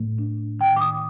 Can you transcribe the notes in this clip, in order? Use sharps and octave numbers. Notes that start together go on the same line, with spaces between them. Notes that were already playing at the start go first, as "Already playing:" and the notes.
Already playing: A2 A3
D4
D#3 G5
D6
D#6